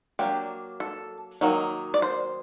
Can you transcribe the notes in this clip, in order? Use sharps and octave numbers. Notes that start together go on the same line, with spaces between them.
F#3 A#3 D4 G4
A4
D#3 F#3 A#3 D#4
D5
C5